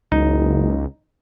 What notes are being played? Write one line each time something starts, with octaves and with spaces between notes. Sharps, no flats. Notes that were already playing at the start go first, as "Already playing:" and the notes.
F#1 C#2 D#4